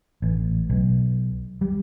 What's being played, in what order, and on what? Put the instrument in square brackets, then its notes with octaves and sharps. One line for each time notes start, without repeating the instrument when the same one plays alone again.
[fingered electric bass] A1
B1
G3